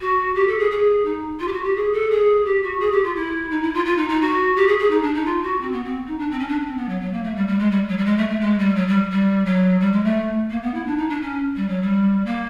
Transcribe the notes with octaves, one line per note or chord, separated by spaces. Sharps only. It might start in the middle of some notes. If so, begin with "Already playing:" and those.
F#4
G4
A4
G#4
G#4
D#4
F4
G4
F#4
G4
G#4
A4
G#4
G4
F#4
G#4
G4
F4
E4
D#4
E4
F4
F4
D#4
D#4
F#4
G4
G#4
G#4
D#4
D4
D#4
F4
F#4
C4
B3
C4
D#4
D4
C4
C#4
D4
C#4
C4
B3
F#3
F#3
A#3
A3
G3
G3
G#3
G3
F#3
G3
G#3
A3
A3
G#3
G3
F#3
G3
G3
F#3
G3
G#3
A3
A#3
B3
E4
D4
D#4
D4
C#4
G3
F#3
G3
A#3